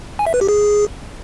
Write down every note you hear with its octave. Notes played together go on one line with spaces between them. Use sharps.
G#5
E5
B4
G4
G#4